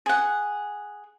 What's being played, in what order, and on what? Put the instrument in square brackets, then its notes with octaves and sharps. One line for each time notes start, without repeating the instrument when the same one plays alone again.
[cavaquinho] G#4 F#5